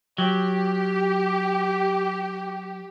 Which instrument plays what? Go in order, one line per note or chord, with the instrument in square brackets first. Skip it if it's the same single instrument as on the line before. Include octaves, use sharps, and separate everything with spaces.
[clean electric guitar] F#3 [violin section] G4